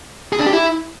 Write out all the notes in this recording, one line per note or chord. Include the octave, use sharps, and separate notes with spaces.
G#4
D4
G4
E4